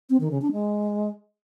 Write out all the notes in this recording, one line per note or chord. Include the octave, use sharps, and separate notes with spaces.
C4
D#3
C#3
D4
G#3